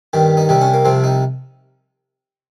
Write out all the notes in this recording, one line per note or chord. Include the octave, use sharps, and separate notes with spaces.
G2 D#3 G3
D#4
C2 C3 G3 D#4
C#4
A#3
C2 C3 F3 C4
D#4